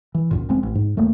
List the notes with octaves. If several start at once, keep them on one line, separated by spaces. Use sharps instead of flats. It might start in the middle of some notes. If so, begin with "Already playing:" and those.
E3
C#2 F#2 A#2
F1 G#3 C4
A1
G#2
D#1 A3 A#3